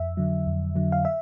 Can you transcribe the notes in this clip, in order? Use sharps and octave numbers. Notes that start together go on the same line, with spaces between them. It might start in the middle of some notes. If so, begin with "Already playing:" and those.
Already playing: F2 E5
D3 F#3
F2
D3 F#3
F5
E5